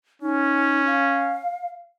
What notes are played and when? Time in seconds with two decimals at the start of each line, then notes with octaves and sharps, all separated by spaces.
0.22 C#4 D#4
0.87 F5